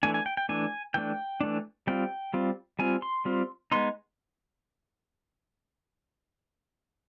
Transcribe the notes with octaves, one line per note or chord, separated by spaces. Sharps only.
E3 A3 D4 G#5
G#5
G5
G5
E3 A3 D4 G#5
E3 A3 D4 G5
E3 A3 D4
G3 C4 F4 G5
G3 C4 F4
G3 C4 F4 G#5
C6
G3 C4 F4
G#3 B3 D#4 C6